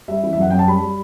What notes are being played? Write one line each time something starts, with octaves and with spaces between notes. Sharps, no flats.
G3 E5
E3
E5
F#2 F#5
F#2 G5
A5
G3 B5
G3